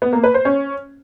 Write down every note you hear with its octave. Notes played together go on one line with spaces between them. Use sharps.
B3
A#3
B4
C5
C#4